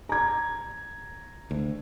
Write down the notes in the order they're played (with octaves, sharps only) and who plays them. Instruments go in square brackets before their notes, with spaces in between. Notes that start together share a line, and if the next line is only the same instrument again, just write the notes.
[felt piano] A#5 G#6
[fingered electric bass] D2